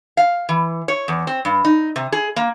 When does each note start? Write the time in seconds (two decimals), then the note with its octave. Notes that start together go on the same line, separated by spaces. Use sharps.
0.17 F5
0.49 E3
0.88 C#5
1.08 E2
1.27 C4
1.45 G2
1.65 D#4
1.96 C3
2.12 G#4
2.36 A#3